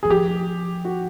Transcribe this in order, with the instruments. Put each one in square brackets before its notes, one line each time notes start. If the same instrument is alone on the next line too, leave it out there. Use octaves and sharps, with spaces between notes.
[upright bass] E3 [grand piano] G#4
[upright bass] F3 [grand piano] G4
[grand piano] F#4